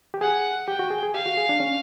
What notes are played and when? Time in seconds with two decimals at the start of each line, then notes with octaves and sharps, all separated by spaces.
0.14 G4
0.21 G#4 F#5
0.68 G4 G5
0.79 F#4
0.91 G#4
1.03 G#4
1.14 G4 F5
1.26 F#4
1.37 G#4
1.49 D4
1.60 C#4